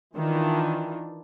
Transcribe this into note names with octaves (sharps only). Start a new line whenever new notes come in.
D#3 E3 D4 F4